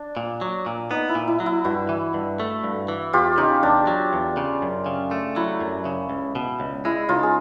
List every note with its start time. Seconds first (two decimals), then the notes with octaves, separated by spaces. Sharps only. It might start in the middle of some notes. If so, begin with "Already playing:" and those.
Already playing: D4
0.17 A#2
0.41 F#3
0.66 A#2
0.91 B3 D#4
1.09 E4
1.15 A#2
1.28 E4
1.40 F#3
1.46 E4
1.64 G2 E4 F#4
1.89 E3
2.14 G2
2.40 A3
2.64 G2
2.88 E3
3.13 E2 F4 G4
3.38 C#3 D#4
3.63 E2 D4
3.87 F#3
4.13 E2
4.37 C#3
4.62 F#2
4.86 C#3
5.11 A3
5.36 F#3 E4
5.61 F#2
5.85 C#3
6.10 C#2
6.35 B2
6.60 C#2
6.85 G#3 E4
7.09 C#2 D#4 F4
7.23 G#4